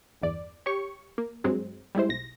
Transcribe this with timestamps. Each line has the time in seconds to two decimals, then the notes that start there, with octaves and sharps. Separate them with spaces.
0.22 G1 E2 D5
0.66 G4 C#5 C#6
1.18 A#3
1.44 G2 F#3 G#3 C4
1.95 G3 G#3 E4 C5
2.09 B1 A#6